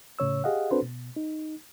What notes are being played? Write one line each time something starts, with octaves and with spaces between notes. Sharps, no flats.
A2 C#3 C#5 E6
G4 G#4 D#5 F5 F#5
C4 D4 F#4 A4 B4 C5
B2
D#4